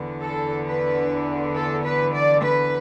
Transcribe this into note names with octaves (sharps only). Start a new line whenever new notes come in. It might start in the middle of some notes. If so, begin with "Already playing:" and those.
Already playing: E2 D3 B3
A4
B4
A4
B4
D5
B4